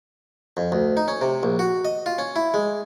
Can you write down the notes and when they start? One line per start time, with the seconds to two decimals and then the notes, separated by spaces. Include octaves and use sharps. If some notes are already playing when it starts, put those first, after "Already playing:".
0.57 F2
0.72 D2
0.97 D#4
1.08 C#4
1.21 C3
1.43 A#1
1.59 F#4
1.85 D#5
2.06 F4
2.18 C#4
2.36 E4
2.54 G#3